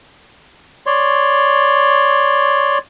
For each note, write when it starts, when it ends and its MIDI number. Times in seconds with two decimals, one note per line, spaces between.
0.86 2.78 73
0.86 2.78 74
0.86 2.78 84